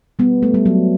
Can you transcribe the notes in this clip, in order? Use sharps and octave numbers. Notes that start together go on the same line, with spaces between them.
G3 B3
A3
G3
F#3